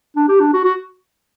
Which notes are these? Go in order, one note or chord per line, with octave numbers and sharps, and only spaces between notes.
D4
G4
D4
F#4
F#4